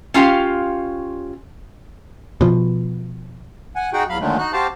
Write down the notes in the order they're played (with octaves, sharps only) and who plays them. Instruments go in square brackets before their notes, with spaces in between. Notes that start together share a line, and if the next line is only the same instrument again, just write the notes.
[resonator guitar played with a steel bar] C#4 F4 G4 F5
[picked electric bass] B2 F3
[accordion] F#5 G#5
D#4 F#4 G#4 F#5 G5
E2 F#3 F5 B5
A#2 D3 D#3 F#3 G#3 A3
D#4 F#4 F#6
C4 F#4 G4 C5 F5 A5